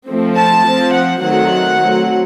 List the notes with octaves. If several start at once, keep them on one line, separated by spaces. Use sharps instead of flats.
F3 A3 C4
A5
F3 C4
F#5
D#3 F#3 A3 C4 F#5
F#3 A3 C4